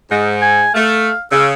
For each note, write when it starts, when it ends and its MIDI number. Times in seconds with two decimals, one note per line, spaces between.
0.10 0.62 44
0.42 0.74 80
0.74 1.10 57
0.74 1.23 77
1.32 1.53 49
1.32 1.46 88